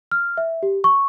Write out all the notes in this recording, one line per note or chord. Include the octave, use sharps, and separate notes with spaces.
F6
E5
G4
C#6